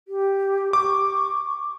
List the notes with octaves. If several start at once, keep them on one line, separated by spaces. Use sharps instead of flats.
G4
C#6 D6